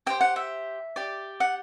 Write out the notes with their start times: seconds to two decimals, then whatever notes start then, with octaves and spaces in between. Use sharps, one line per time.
0.06 G4 C5 G5
0.21 F#5
0.36 E5
0.96 G4 D5
1.40 F#5